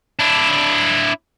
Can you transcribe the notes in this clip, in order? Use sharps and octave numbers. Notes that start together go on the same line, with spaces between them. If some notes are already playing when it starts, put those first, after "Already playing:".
D4 E4